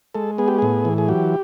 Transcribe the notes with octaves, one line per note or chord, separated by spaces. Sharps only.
G#3 A4
B3 G#4
G4
A2 G#4
E3
G#4
F#3 G4